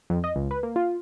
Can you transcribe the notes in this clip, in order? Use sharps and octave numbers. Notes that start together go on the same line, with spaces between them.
F2
D#5
C#2
B4
A#3
F4